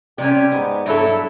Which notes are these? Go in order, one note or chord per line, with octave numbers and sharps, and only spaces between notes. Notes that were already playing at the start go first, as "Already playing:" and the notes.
C3 G3 C#4 G4 D5
G#2 B3
G2 F#3 G3 E4 A4 C#5